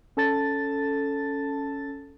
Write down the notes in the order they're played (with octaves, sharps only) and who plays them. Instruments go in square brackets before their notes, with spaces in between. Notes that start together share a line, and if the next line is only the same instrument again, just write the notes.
[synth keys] C#4 A4 A5 A6